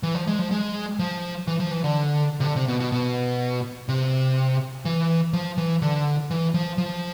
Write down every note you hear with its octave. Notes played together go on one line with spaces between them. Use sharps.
E3
F3
G#3
F3
G#3
F3
E3
F3
E3
D3
C3
D3
C3
B2
B2
B2
C3
E3
F3
E3
D3
E3
F3
F3